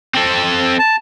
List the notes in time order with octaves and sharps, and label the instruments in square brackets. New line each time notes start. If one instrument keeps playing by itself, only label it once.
[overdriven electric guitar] C4 A4
[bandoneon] A5